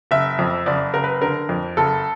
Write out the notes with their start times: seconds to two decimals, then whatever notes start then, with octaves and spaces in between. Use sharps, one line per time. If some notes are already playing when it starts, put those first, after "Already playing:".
0.11 F#1 E5
0.39 F2
0.66 F#1 D5
0.94 F#1 A#4
1.04 B4
1.22 D3 A#4
1.49 F2
1.77 F#1 A4